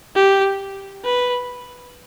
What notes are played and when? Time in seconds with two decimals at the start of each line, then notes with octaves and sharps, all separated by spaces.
0.15 G4
1.05 B4